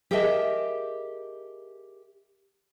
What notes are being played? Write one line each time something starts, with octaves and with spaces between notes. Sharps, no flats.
G4 G#4 A#4 D#5 E5 A5